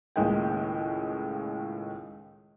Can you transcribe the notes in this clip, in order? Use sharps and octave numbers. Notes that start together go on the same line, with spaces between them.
C#2 A2 D#3 G#3 A#3 G5